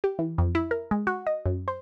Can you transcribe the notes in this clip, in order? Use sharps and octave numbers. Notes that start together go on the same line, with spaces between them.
G4
E3
F2
E4
A#4
G#3
F#4
D#5
F#2
C5